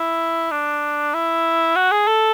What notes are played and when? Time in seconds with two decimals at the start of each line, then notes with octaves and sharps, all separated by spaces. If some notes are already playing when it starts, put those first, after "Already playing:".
Already playing: E4
0.52 D4
1.14 E4
1.76 F#4
1.91 G#4
2.07 A4